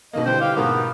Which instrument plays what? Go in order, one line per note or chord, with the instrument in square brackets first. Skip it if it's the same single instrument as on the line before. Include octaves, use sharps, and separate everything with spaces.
[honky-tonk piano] B2 D#3 A#3 [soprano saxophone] D#5
[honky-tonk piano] D3 E3 G3 [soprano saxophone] C5 [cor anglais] G5
[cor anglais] G4 [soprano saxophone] F5
[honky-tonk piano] G#2 B2 [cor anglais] B3 [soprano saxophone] A#4